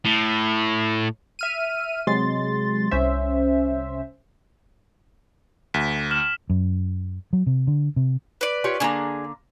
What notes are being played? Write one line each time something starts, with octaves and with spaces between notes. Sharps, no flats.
A2
E5 F6 D#7
C3 F#3 G#3 C6 A6
C2 C#4 C5 E5
D2 B6
F6 E7 F#7
F#2
F#3
C3
D3
C3
B4 D5
F4 G4 C#5
D3 A#3 D4 G#4 A#5